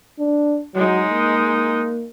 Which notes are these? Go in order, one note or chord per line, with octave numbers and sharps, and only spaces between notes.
D4
F#3 G#3 D#4
A#3